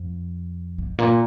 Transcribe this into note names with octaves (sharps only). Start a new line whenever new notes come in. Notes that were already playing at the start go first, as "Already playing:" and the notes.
Already playing: F2
G#2
A#2